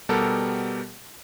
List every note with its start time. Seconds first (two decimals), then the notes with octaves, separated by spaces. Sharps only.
0.09 B2 G3 B3 G4 A4 A#4